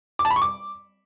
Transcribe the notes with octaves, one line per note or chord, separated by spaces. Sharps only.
D6
A5
B5
C#6
D6